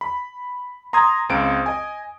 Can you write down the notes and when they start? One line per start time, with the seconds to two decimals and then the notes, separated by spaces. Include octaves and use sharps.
0.01 B5
0.93 A#5 C6 D#6 G#6
1.29 C#2 C4 F5 D7
1.66 D#5 G#5